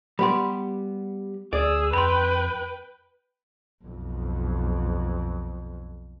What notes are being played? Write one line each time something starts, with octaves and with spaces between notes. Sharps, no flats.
G3 B3 G4 B5 C6
D2 G#4 D5 E6
F2 B4 G5 B5 C6
B1 F2